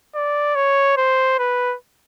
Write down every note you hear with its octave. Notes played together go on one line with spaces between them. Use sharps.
D5
C#5
C5
B4